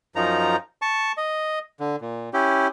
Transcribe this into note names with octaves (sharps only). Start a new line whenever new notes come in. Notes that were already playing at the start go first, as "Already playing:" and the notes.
F#2 F3 D#4 A#5
A5 C#6
D#5
D3
A#2
C#4 E4 G4